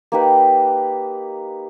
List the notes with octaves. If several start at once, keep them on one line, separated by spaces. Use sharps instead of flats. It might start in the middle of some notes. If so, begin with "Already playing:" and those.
A#3 D#4 G4 B4